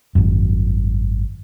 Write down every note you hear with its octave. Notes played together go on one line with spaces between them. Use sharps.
G#1 F#2